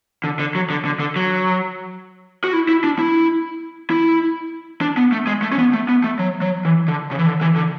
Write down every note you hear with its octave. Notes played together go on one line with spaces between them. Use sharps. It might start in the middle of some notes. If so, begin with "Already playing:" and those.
D3
D3
F#3
D3
D3
D3
F#3
F#4
E4
E4
D4
E4
E4
D4
B3
A3
G#3
A3
C#4
B3
A3
B3
A3
F#3
F#3
E3
D3
C#3
E3
D3
E3
D3